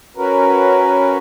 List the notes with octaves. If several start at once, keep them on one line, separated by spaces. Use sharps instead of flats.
C#4 F#4 A#4 B4